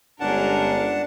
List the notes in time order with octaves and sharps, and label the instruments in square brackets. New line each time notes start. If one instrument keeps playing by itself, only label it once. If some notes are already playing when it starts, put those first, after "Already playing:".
[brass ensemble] G1 [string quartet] G#3 C#4 A#4 [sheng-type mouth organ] D4 [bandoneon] F#5 A5